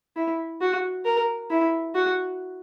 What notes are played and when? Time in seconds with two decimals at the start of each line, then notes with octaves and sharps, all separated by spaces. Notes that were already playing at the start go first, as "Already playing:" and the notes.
0.16 E4
0.61 F#4
1.05 A#4
1.50 E4
1.95 F#4